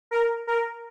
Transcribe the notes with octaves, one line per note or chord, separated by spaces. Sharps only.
A#4
A#4